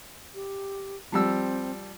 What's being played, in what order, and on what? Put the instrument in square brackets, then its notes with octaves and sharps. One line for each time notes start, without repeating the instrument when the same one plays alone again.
[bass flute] G4
[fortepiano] F3 G3 E6 [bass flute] C4